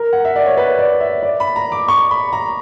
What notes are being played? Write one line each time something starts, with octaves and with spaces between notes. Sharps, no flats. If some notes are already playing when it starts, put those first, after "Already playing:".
Already playing: A#4
F#5
E5
D5
C#5
B4
D5
E5
D5
B5
A#5
D6
C#6
B5
A#5